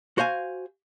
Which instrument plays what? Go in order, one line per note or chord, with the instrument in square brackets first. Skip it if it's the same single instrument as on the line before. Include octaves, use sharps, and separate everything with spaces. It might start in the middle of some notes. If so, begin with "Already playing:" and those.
[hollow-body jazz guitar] F#4 C5 F5 G#5